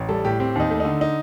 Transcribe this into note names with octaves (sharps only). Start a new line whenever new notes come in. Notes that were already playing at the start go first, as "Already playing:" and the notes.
Already playing: A1
G3 A4
A2 G4
C4 G4
D#2 D#4
A3
D3 D#4
D#4